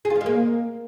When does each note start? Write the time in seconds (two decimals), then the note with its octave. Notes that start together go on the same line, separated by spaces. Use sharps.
0.05 G#4
0.10 F4
0.15 F3
0.21 G#3
0.26 A#3